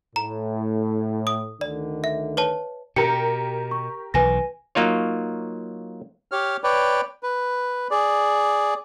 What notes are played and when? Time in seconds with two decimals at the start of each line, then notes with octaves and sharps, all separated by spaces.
0.16 A2 A#5
1.27 D#6
1.61 D2 D3 D#3 D5
2.04 E5
2.37 B4 C#5 A5
2.96 B2 G4 A#4 C#7
3.71 C#6
4.14 B1 E3 B4 G#5 A#6
4.75 F#3 A#3 D#4 F4 C#5
6.31 G4 C#5 F6
6.64 B4 C#5 D5 G5
7.23 B4
7.91 G#4 D5